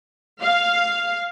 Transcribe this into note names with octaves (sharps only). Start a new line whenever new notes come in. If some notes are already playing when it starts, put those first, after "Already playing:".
F5